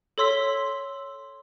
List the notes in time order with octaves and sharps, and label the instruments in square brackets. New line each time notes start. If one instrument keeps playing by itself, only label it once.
[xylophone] A4 C#5 C6 E6 B6